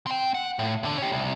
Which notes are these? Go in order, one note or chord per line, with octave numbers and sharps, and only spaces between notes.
C4 G5
F#5
A2
E2 D3
C#4 G4
C2